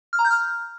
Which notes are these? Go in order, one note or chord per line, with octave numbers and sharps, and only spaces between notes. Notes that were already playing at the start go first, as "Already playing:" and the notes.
F6
A#5
G6
F6